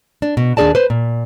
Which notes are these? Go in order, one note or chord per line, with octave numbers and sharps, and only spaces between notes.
D4
B2
D#2 D4 G#4 D5 A5
B4 C5
A#2